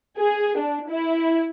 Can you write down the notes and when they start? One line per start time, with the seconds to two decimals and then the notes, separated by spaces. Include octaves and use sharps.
0.19 G#4
0.58 D4
0.90 E4